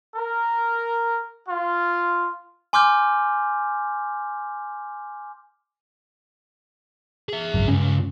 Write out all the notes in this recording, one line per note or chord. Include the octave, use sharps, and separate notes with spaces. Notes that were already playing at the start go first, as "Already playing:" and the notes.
A#4
F4
G#5 C6 D6 F6 G6
G#4 E5
G#1 C#2 F#2
C#2 G2 C#4